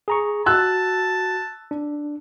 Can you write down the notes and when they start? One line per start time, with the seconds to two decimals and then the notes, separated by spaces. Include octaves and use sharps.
0.08 G#4 A#5 C#6
0.46 F#4 A5 E6 F#6
1.71 D4